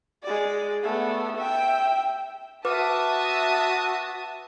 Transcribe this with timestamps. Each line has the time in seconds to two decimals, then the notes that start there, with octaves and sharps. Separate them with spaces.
0.24 G#3 D5
0.84 A3 B3
1.37 E5 G5
2.65 F#4 B4 E5 A5 D6 D#6